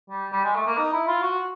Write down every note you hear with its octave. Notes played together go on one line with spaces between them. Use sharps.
G3
G3
G#3
A3
A#3
D#4
E4
F4
F#4